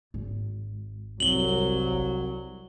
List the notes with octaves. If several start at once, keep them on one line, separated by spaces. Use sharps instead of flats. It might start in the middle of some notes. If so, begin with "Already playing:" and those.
G#1
C2 F#3 F#7 G7